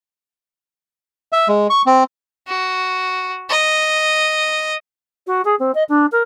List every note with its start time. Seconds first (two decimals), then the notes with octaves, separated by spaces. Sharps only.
1.32 E5
1.48 G#3
1.70 C#6
1.86 C4
2.48 F#4
3.50 D#5
5.27 F#4
5.45 G#4
5.59 C4
5.74 D#5
5.89 D4
6.12 A#4